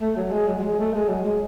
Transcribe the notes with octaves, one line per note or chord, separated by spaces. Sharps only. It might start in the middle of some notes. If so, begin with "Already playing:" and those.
A3
F#3
G#3
F#3
F#3
G#3
A3
G#3
F#3
G#3